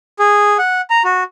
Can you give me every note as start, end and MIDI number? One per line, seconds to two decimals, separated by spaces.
0.19 0.57 68
0.59 0.81 78
0.90 1.03 82
1.04 1.23 66